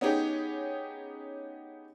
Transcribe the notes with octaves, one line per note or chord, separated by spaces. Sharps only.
B3 C#4 D#4 G4 G#4